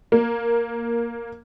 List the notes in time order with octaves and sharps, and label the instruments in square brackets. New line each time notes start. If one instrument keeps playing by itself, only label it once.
[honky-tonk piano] A#3